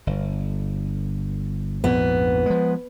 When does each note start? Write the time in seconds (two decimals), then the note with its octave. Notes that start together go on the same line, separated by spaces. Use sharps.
0.07 G1
1.84 A#1 F2 G#2 B3
2.46 F3 G#3